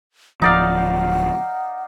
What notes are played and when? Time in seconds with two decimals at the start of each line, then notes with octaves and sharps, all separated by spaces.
0.42 D1 F3 D#4 D5 F5 F#5